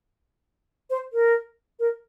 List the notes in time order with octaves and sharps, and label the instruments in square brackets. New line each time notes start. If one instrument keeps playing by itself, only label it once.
[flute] C5
A#4
A#4